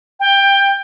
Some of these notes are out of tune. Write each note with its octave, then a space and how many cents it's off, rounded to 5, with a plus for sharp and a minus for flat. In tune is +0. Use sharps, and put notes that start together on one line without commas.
G5 +15